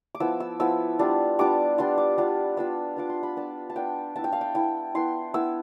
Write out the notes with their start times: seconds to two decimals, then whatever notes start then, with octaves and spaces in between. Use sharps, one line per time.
0.15 D6
0.20 F3 B3 E4 E6
0.40 E6
0.60 F3 B3 E4 E6
0.99 G3 B3 D4 F4
1.39 G3 B3 D4 F4 D6
1.78 G3 B3 D4 F4 C6
1.98 D6
2.18 G3 B3 D4 F4
2.57 B3 D4 F4 E6
2.96 B3 D4 F4 D6
3.09 C6
3.23 B5
3.36 B3 D4 F4 A5
3.70 A5
3.76 B3 D4 F4 G5
4.15 B3 E4 A5
4.24 G5
4.32 F5
4.41 G5
4.55 B3 E4 G5
4.95 B3 E4 C6
5.34 B3 E4 E6